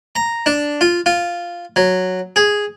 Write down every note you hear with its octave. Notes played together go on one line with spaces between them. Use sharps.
A#5
D4
F4
F4
F#3
G#4